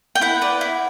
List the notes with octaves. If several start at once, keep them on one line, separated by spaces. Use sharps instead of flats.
G5
E4 F#5
B4 D5
E4